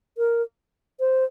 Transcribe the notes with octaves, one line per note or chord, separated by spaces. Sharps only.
A#4
C5